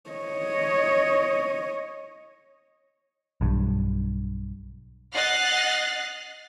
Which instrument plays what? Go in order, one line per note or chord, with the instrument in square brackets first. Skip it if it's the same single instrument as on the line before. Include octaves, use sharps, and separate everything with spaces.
[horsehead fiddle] C#5 D#5
[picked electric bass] B1 G2
[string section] D#5 F#5 F6 F#6 A6 C7